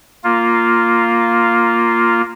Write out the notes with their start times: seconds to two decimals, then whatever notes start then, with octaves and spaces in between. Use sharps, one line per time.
0.24 A#3 F4